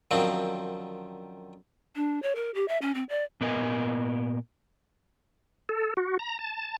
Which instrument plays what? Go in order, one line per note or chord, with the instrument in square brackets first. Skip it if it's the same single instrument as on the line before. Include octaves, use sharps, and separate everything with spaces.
[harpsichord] F#2 D3 D#3 F3 C4
[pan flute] D4
C#5
A#4
G4
E5
C#4
C4
D5
[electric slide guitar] A#2 B3 A#4 D#5 G#5
[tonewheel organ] A4
F#4
A#5
A5